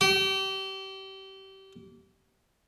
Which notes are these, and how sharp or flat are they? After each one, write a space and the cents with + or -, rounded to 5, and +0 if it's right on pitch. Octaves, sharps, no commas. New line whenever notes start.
G4 -30